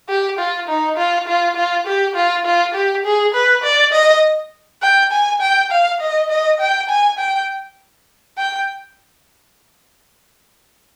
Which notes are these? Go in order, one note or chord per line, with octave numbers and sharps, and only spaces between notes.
G4
F4
D#4
F4
F4
F4
G4
F4
F4
G4
G#4
B4
D5
D#5
G5
G#5
G5
F5
D#5
D#5
G5
G#5
G5
G5